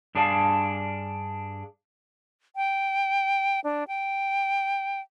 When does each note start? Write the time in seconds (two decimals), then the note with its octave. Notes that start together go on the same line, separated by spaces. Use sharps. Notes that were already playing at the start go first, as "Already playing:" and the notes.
0.15 G2 D4 G#4 D5 F5 A5
2.56 G5
3.64 D4
3.88 G5